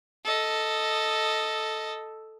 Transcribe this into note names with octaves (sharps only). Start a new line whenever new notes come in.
A4 D#5